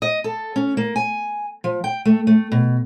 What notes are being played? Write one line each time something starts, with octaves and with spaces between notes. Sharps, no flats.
D#5
A4
C#4
A#3
G#5
F3
G5
A3
A3
B2